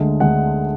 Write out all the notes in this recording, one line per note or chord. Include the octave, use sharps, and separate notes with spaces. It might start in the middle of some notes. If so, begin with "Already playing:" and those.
Already playing: D2 D3 G#3
D2 D3 G#3 F#5